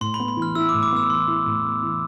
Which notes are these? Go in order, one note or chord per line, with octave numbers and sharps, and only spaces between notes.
A2 C6
B5
B3
B5
E3
F6
E4 E6
D6
A2
D6
B3 E6
E3 C6
E4
A2
B3
E3